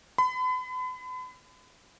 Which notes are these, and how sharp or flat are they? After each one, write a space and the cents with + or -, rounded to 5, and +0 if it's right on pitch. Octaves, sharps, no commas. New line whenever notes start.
B5 +40